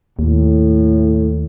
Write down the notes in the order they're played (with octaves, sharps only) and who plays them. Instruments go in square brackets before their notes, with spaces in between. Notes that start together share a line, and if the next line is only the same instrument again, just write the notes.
[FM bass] D#2 [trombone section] A2